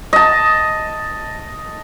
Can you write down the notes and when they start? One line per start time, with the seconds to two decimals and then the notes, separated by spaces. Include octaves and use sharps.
0.13 D#5 A5